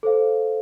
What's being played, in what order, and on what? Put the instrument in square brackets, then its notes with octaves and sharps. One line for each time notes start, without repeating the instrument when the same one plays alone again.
[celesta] A4 C5 F5